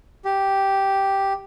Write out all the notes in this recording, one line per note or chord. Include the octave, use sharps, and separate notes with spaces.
G4